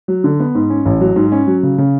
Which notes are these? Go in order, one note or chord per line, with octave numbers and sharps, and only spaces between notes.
F#3
D3
B3
G#2
C#4
A1
F#3
G#2
C#4
F#3
C#3
C#3